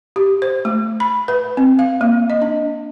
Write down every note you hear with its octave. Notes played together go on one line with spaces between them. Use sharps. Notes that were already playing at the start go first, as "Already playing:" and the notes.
G4
C5
A3
B5
B4
C4
F5
A#3
D#5
D4